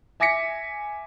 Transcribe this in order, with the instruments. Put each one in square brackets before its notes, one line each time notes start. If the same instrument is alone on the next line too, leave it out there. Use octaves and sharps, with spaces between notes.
[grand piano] E5 G#5 D6 A#6 B6 C#7